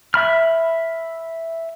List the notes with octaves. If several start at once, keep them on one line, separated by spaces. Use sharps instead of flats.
E5 B5 F6